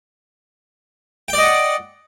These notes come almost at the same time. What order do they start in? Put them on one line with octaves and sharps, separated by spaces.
G5 D5 D#5 F#5